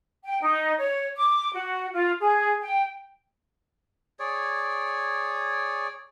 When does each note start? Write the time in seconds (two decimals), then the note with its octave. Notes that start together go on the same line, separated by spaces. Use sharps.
0.24 G5
0.41 D#4
0.78 C#5
1.17 D6
1.53 F#4
1.93 F4
2.20 G#4
2.61 G5
4.19 G#4 C#5 D5